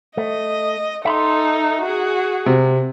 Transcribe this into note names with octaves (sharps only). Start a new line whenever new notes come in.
A3 D#5
D#4 A4 E5 B5 C6
F#4 G#4
C3